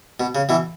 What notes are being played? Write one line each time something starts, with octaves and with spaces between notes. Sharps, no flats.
B2
C#3
B2 E3